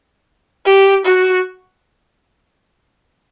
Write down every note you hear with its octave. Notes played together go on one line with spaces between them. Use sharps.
G4
F#4